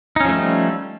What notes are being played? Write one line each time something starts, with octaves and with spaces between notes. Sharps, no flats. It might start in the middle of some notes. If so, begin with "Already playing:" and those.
F3 G3 A3 C#4 D#4